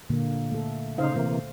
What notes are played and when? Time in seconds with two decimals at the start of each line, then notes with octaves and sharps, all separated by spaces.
0.10 A#2 D3 A#3
0.52 A3 A4
0.98 C#3 D#4 C5 F5
1.16 C3 E3 A#3